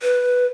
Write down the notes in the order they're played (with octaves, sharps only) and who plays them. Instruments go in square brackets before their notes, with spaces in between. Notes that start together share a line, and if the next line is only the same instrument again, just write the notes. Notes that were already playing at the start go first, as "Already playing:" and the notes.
[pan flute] B4